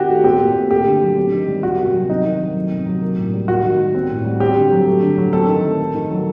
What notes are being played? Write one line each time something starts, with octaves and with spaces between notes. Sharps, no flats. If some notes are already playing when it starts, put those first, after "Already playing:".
Already playing: D#3 C4 F#4 G4
A3
C4 G4
A#2
A3
A3 G4
D3
F#3
C4
D#3
G3
A#3 F#4
C3
F#3
C4 D#4
D#3
F#3
A3
C3
F#3
A#3
A2
G3
A#3 F#4
D#3
G3
C4
A2
G3
C4 G4
D3
F#3
A3
D3
F#3
C4 A4
D#3
A3
A3
D#3
F#3